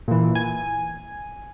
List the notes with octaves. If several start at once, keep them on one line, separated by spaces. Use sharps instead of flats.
A#2 E3
G#5